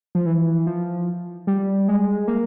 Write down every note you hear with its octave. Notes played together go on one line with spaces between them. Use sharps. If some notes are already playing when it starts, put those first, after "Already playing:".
F3
E3
F3
G3
G#3
A#3